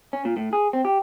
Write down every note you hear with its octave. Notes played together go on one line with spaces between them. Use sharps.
C#4
A#2
A2
G#4
C4
G4